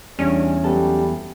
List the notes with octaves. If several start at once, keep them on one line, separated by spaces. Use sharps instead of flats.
E2 G3 C#4 D4 C#5
F#3 G3 B3 A4